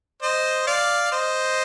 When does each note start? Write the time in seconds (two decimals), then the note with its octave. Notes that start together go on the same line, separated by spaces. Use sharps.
0.22 C5 D#5
0.67 D5 F5
1.12 C5 D#5